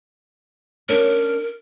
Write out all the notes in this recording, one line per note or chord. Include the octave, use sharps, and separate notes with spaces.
C#4 D4 A#4